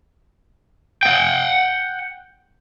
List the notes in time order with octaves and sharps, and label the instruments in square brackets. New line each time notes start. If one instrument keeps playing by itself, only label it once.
[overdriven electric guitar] F#5 G5